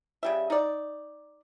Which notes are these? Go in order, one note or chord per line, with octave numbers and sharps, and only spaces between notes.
C#3 G3 E5
D#4 D5